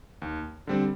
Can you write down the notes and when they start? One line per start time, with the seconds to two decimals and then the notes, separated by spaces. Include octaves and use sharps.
0.22 D#2
0.67 D3 G3 C4